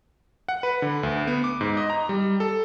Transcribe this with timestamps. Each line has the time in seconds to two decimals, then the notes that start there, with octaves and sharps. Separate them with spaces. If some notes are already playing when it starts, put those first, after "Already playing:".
0.49 F#5
0.63 B4
0.82 D3
1.03 D2
1.27 B3
1.44 D6
1.61 G#2
1.77 D#5
1.90 A#5
2.09 G3
2.40 A4